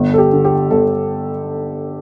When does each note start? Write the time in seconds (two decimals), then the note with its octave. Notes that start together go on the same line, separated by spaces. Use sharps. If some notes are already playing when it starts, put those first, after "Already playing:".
Already playing: G1
0.14 A4
0.18 G4
0.32 D3
0.45 G4
0.71 G1 A4